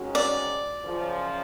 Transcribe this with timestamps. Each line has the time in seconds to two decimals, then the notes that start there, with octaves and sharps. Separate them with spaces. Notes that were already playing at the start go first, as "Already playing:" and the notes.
Already playing: G#2 D#3 G#3 C#4 F#4
0.15 D5
0.84 F#2 C#3 F3